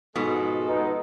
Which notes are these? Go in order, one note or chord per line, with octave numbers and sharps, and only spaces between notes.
G#2 B2 F3 G#3 A4
B3 D#4